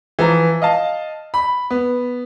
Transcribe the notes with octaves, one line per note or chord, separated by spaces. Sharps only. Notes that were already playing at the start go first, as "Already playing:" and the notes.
E3 F3 A#5
D#5 F5 A5
B5
B3